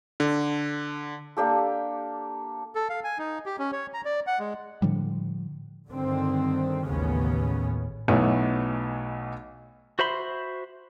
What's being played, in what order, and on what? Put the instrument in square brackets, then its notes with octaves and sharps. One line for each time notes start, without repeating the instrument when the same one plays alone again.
[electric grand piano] D3
[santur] A#3 D4 G4 A4
[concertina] A4
F5
G#5
D#4
G4
C#4
C#5
A#5
D5
F#5
G#3
[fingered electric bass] A2 D3 F3 G3
[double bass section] G2 D3 D#3 C4
A1 D#2 A2 C#3 B3 C#4
[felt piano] B1 B2 E3 F#3 A3 B3
[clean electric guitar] F#4 C5 E5 B5 C6